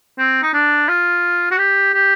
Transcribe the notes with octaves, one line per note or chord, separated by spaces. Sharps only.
C4
D#4
D4
F4
F#4
G4
G4